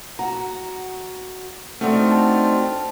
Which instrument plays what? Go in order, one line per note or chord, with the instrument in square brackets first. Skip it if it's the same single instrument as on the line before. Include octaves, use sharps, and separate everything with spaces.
[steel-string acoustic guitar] F#4 [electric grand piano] A#5
[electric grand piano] A3 [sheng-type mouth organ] C4 F6 [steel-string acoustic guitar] D4 D#4 F#4
[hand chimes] A5